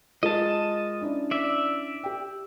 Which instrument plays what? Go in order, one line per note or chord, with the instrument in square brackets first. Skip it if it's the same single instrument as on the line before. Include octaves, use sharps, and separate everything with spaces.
[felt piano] G#3 F4 A#4 [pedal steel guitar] D#5 A5
[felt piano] C#4 D4 E4
[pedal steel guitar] D5 E5
[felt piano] G4 G5